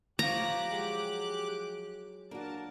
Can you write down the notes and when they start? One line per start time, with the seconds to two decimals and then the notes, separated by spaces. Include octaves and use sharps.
0.19 F3 F4 G4 C#5 F5 A#5 D6 F#6
0.71 F#3 G#3
2.31 A#3 D4 F#4 A#4 A5